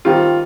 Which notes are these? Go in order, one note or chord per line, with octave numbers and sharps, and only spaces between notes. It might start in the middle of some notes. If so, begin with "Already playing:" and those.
D#3 G3 C4 F4 G4